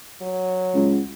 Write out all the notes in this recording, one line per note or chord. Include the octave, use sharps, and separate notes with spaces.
F#3
C#2